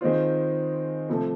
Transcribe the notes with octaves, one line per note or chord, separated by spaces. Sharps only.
D#3 G#3 C4 F4
C3 F3 A3